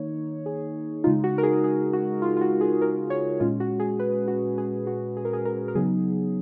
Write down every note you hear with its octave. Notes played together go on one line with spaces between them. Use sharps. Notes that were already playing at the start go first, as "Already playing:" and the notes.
Already playing: D#3 A#3 D#4 C#5
G#4
C#3 G#3 D#4 F4
F#4
A#4
G#4
G#4
F#4
F4
F4
F#4
G#4
A#4
C#5
A#2 G#3 C#4 F4
F#4
G#4
B4
F#4
G#4
F#4
G#4
A#4
G#4
A#4
A#4
C#3 F#3 B3 D#4 G#4